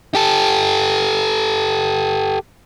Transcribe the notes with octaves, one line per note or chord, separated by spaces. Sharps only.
G4 A4